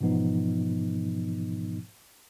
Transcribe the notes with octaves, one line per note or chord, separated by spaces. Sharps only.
G#2 B2 E3 F3 B3 D#4